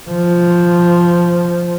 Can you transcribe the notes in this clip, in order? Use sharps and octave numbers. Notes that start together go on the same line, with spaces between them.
F3